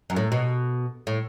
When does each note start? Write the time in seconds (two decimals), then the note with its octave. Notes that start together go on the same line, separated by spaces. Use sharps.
0.10 F#2
0.16 A2
0.32 B2
1.07 A2